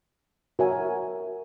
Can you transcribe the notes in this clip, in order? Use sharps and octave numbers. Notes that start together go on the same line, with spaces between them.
F#4 A#4 C#5 E5 G#5